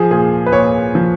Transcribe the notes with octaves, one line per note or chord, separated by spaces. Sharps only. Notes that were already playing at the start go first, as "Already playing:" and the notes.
Already playing: F3 G#4
A#2 G#4
B4
A#2 C#5
F3